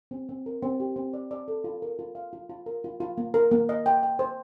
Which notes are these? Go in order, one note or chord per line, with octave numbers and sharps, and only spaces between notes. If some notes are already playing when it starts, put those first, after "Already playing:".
C4
C4
A#4
C4
G4
C4
D5
D5
A4
F4
A#4
F4
F5
F4
F4
A#4
F4
F4
A#3
A#4
A#3
D#5
G5
G5
C5